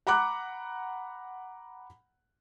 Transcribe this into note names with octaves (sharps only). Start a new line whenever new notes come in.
F#5 A#5 B5 D6 F#6